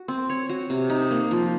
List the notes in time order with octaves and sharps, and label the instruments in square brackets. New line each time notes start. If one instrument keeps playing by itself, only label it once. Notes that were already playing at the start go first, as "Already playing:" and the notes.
Already playing: [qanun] F#4
C4
C#5
F#4
C3
D#4
A#3
F3